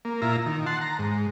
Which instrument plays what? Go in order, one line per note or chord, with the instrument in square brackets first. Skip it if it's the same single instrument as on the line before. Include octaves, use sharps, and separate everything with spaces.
[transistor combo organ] A#3
A#2 E4 F4 A#5
D#3
F#5 A5 C6
A#5
G#2